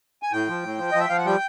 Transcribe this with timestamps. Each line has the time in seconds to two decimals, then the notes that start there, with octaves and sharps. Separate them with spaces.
0.23 G#5
0.32 A2 G5
0.48 F3
0.63 A2
0.78 F3
0.92 F3 D#5
1.00 E5
1.09 F3 F5
1.18 F#5
1.25 G3 G5